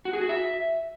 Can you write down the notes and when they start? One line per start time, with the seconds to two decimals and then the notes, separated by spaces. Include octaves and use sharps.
0.05 F#4
0.13 G#4
0.21 F#4
0.29 E5